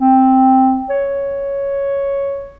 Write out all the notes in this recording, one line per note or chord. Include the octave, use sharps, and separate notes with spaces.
C4
C#5